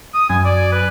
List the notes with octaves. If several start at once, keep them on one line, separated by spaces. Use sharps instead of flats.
D#6
F#2 G#5
D5
B4